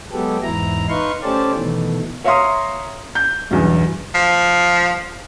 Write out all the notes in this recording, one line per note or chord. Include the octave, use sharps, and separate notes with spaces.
F#3 G#3 B3 G4 A4
E2 G#2 E4 A#5
D#4 B4 F5 C6 C#6
A3 C#4 G4 C5 D5 A5
B2 D#3 E3 A3
C#5 E5 F5 A#5 C6 D#6
G6
B1 E2 G2
F3